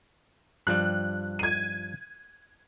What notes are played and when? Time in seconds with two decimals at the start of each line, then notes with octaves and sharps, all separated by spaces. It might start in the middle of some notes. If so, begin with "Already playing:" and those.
0.67 G2 F3 G3 F#6
1.39 G#6 D#7